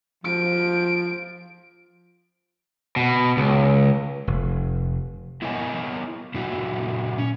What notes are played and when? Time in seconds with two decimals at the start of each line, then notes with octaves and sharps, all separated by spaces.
0.25 F3 D7
2.96 B2
3.37 C#2
4.27 F1
5.42 B3 E4 A#4 C#5 D#5 G#5
6.34 A#2 F#3 E4 F#4
7.18 C#4